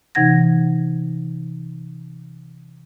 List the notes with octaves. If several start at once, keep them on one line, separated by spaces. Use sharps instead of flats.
C3 E3 D#4 F#5 G#6 A#6